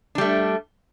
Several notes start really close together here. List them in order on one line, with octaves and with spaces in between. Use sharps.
D4 G3 A3